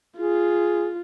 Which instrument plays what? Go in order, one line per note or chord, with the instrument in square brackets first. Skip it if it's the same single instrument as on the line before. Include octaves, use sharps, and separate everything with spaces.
[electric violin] F4 [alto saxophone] G#4